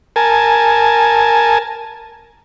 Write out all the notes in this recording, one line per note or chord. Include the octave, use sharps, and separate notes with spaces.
A#4 G#5 A5